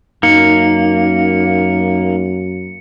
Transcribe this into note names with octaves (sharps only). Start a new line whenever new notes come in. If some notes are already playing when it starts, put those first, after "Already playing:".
F#2 A#3 D#4 C#7